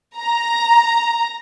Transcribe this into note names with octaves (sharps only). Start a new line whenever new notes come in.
A#5